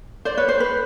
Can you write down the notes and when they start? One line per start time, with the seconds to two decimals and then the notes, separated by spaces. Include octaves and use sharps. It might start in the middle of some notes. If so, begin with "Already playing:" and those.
0.25 C5 D5
0.37 B4 C#5
0.49 C5
0.60 B4